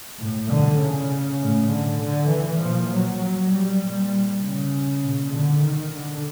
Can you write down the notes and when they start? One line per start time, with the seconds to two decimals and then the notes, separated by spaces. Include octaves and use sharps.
0.19 A2
0.49 D3
0.79 C#3
1.39 A2
1.69 D3
1.99 D3
2.29 E3
2.59 A#2 F3
2.90 F#3
3.20 F#3
3.50 G3
3.81 A#2
4.41 C#3
5.02 A#2
5.32 D3
5.61 D#3
5.92 D3